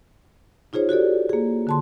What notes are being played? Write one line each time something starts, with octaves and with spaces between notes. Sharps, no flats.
D#4 F4 G#4 C5 C#5
F#4 G4 A4 D5
A#3 G#4
D3 A5 C6